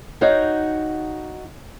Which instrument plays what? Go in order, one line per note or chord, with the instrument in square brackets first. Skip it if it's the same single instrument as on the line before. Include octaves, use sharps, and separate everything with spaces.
[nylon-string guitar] D#4 F#4 C#5 F5 G5